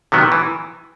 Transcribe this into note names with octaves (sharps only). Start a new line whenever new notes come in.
C3 D#3 F#3 B3
E3